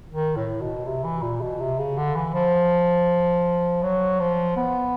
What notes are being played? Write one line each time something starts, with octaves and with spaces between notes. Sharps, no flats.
D#3
A2
B2
C3
E3
A#2
B2
C3
C#3
D3
E3
F3
F#3
F3
B3